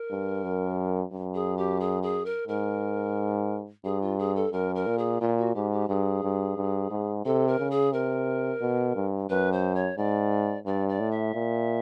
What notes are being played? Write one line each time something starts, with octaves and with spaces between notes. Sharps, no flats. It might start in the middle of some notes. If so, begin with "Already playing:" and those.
Already playing: A#4
G2
F#2
F#2
G#4
G4
G#4
G#4
A#4
G#2 A#4
G2 G#4
F4
G#4
A4
F#2 A#4
A#4
A#2
G#4
A#2 F4
F#4
G#2 G4
G4
G2 G#4
G2
G2
G#2
C3 A4
A#4
C#3
G#4
C3 A#4
B2
G2
F#2 B4
C5
C#5
G#2 D5
G2 D5
D5
A2
E5
A#2